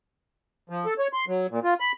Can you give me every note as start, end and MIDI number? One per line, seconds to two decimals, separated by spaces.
0.70 0.86 53
0.86 0.94 69
0.99 1.07 73
1.13 1.25 84
1.28 1.47 54
1.51 1.60 46
1.64 1.74 65
1.80 1.92 83